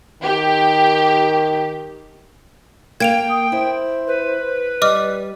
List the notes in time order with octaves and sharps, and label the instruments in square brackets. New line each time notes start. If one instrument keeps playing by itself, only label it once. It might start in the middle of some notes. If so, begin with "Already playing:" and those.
[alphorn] D#3 [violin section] G4
[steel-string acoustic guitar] A#3 [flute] F5 [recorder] G5 [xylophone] G#6 D7 F7
[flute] D#6
[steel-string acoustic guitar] E4 [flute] C5
[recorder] B4
[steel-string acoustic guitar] G3 [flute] D5 [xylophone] D#5 D6 F6